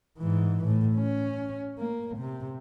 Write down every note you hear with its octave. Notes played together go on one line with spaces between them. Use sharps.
G#2 E3
A2
C#4
A#3
C3